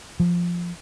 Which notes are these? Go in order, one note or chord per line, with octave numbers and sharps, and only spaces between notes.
F3